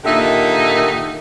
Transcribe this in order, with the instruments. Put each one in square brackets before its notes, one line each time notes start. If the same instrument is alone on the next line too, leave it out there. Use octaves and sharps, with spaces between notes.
[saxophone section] A#2 D3 D#3 D#4 G4 E5